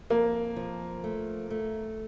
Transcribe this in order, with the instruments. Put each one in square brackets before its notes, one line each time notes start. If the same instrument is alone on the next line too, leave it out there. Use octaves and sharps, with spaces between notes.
[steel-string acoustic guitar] F2 [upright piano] A#3
[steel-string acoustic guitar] F3
A3
A3